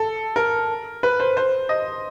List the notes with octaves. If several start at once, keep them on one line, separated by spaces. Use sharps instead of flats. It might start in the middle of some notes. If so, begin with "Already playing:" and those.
Already playing: A4
A#4
B4
C5
C5
D#5